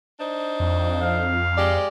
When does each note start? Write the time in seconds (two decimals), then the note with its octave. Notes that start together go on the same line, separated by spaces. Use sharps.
0.20 D4 D#4 C5
0.60 F2
1.02 F5
1.56 G#3 G4 D5